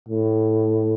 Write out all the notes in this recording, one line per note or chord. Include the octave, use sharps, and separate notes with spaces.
A2